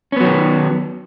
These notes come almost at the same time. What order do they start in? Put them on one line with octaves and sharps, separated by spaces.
C#4 B3 F#3 D#3